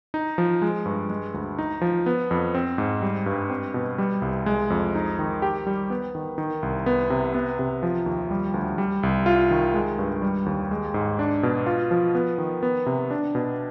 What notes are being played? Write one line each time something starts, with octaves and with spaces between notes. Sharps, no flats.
D#4
F3
G#3
G2
G#3
D2
D#4
F3
B3
F2
C4
G#2
G3
G2
C4
B2
G3
C2
G#3
F2
D#4
D#3
G4
G3
B3
D#3
D#3
C2
B3
C3
B3
C3
F3
D#2
G3
D2
G3
C2
F4
D#3
G#3
G2
G3
D#2
G#3
G#2
D4
B2
F4
F3
B3
D#3
B3
C3
D4
B2